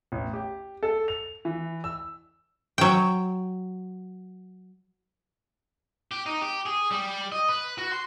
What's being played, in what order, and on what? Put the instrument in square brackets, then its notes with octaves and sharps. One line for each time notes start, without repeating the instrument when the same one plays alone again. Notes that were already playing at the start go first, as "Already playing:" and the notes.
[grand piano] A1
G4
A4
F7
E3
E6
[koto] F#3 G5
[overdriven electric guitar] G4
D#4
G4
G#4
G3
D#5
B4
F#4
C6